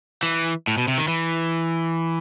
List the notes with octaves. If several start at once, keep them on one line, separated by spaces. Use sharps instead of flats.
E3
A2
B2
C3
D#3
E3